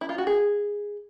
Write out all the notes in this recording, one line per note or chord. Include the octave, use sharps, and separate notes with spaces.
E4
F4
F#4
G#4